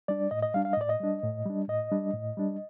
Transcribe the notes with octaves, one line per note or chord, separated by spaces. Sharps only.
G3 D4 D5
A2 D#5
D#5
G3 D4 F5
F5
D#5
A2 D5
D#5
G3 D4
A2
G3 D4
A2 D#5
G3 D4
A2
G3 D4